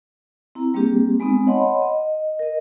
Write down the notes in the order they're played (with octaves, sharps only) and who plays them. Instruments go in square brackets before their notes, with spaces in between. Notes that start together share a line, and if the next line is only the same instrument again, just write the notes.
[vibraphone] C4 E4 A#5
G3 A#3 C4 D4 G4 G#4
G#3 B3 C4 D#4
C#5 D#5 F#5 A5 B5 C6
D#5
A#4 D#5